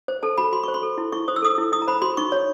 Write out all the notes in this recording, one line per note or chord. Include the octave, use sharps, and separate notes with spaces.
C5
A4 A5
F#4 B5
F#4 C6
C5 C#6
C6
A4
E4
E4 C#6
C5 D#6
E6
A4 D#6
E4
E4 D#6
A#5
C5 B5
F#4 C6
D#4 C#6
C#5